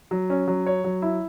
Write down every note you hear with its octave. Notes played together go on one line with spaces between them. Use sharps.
F#3
C#4
F#3
C#5
F#3
E4